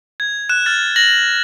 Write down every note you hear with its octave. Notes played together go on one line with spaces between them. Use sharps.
G#6
F#6 E7
F6 A6
A#6 F#7